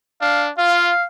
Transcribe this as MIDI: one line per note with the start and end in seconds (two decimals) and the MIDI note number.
0.21 0.51 62
0.21 0.44 77
0.58 0.92 65
0.58 1.04 77